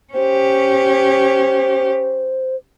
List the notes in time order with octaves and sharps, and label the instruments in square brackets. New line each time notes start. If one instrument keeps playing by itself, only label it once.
[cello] C#4 G4 [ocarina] C5